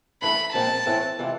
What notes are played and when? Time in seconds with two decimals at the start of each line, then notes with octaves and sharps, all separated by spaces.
0.22 G2 E3 A3 B5
0.53 A#2 F3 G#3 C4 A5
0.86 A2 E3 A3 C4 E4
1.19 C3 E3 G#3 C4 F4